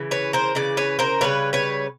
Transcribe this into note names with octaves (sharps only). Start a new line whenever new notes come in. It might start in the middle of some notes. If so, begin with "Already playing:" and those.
Already playing: C#3 E3
B4 C#5
A#4 C5
C#3 E3 D5
B4 C#5
A#4 C5
C#3 E3 G3 B4 C#5
B4 C#5